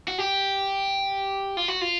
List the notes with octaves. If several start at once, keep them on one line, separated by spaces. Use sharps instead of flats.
F#4
G4
F4
F#4
F4